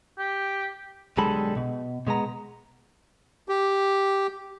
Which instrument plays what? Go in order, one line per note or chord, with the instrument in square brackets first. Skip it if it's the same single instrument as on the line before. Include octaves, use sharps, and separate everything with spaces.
[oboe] G4
[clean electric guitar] B1 D3 G3 G#3 A4 B5
B2
B2 G#3 B3 A#5
[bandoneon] G4